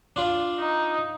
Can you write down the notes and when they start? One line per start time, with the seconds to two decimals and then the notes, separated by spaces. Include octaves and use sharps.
0.16 D4 F4 D5
0.60 D#4